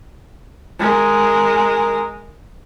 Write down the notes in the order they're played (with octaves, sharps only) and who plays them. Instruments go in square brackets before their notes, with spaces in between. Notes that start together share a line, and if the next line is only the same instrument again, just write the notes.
[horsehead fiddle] G#3 A#4